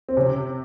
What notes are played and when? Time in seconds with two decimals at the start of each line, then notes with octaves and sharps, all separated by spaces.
0.09 C4
0.17 C3 C#4